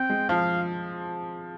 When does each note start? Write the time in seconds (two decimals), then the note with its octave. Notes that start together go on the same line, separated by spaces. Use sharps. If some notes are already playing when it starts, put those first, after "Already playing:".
Already playing: C4 G5
0.10 G#3
0.29 F3 F5